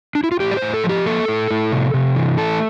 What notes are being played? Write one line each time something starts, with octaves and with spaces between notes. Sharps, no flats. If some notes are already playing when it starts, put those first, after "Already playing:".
D4
E4
F4
A2 G4
D5
A2 C5
A4
F3
G4
A#3 A4
A2
A2
C3
C3
E3
A3 A4